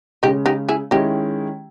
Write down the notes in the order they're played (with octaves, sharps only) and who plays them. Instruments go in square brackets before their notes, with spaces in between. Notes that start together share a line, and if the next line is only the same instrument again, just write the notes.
[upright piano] C#3 G#3 C#4 [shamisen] D#4 G4
[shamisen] D#4 G4
E4 G#4
[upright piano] D#3 G#3 C#4 E4 [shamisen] D#4 G4